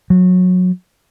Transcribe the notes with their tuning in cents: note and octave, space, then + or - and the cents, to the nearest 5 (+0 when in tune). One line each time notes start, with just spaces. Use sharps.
F#3 -25